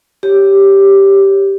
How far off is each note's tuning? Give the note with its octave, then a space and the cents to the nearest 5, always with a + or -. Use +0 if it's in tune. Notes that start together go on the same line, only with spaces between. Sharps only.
G4 +0 C#5 +0